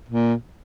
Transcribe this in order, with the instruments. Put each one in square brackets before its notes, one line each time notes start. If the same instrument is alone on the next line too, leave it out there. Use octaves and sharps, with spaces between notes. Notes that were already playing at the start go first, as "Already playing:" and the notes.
[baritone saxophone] A#2